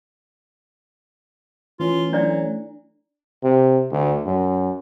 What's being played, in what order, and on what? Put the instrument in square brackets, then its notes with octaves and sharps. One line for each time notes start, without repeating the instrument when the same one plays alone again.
[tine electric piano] E3 C#4 [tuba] A3 [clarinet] F4
[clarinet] F#3 [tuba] A3 [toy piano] D4 E4 D5
[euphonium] C3
D2
F#2